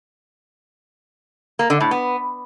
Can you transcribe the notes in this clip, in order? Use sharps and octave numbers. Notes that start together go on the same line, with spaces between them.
A#3
D3
A2
B3